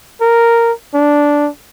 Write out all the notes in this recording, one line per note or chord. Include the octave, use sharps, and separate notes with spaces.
A#4
D4